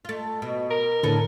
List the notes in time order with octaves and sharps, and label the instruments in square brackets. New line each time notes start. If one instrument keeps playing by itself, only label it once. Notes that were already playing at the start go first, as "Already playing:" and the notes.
[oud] A3 F4
B2
[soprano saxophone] A#4
[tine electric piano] A2 D3 [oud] C#4 A4 B4